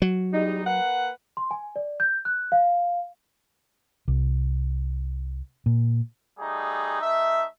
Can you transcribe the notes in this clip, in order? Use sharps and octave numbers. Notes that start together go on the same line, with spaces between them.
F#3
E2 G3 D#4
A#3 B4 F#5
C6
G#5
D5
G6
F#6
F5
C2
A#2
G3 A3 D#4 G#4
A3 D#4 E5